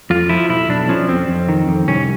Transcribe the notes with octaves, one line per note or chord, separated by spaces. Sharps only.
F2 F4
F3 E4
B1 E4
B1 D4
F3 C#4
F2 C4
F2
D#3
F2
C2 C#4